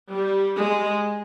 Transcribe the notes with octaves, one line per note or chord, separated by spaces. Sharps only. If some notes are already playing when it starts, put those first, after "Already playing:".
G3
G#3